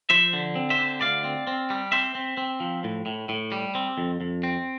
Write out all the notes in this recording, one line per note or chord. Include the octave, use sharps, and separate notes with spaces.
F3 C5 E5
D3
C4
C5 E5
D3
D2 D5 F5
C4
C4
G3
C4 C5 E5
C4
C4
F3
A2
A2
A2
G3
C4
F2
F2
C4